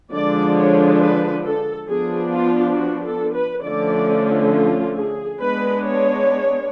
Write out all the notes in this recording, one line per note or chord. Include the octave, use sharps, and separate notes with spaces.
D3 F3 G#3 D4 D5
C#5
B4
A4
F3 B3 D4 G#4
F4
F#4
A4
B4
D3 F3 A3 C#4 D5
F4
G#4
G#3 B3 D4 B4
C#5